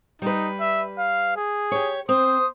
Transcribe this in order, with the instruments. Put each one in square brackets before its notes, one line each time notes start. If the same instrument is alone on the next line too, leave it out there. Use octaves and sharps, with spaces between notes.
[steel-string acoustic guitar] G3 B4 [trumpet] D#4
[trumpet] E5
F5
G#4
[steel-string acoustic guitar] G4 C#5
[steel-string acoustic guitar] C4 [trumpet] C5 [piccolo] D#6